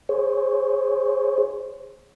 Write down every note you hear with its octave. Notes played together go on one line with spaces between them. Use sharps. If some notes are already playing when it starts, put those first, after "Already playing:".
G#4 C5 C#5